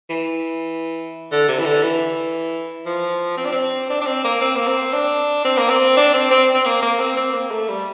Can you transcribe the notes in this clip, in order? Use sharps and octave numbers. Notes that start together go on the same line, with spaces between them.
E3
D3
C3
E3
D3
E3
F3
C4
D4
C4
D4
D4
C4
A#3
C4
A#3
C4
D4
C4
A#3
C4
D4
C4
C4
C4
A#3
A#3
C4
C4
A#3
A3
G3